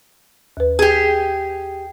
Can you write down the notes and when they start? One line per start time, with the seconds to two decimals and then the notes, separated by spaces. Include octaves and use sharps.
0.57 D#2 B4
0.79 G4 G#4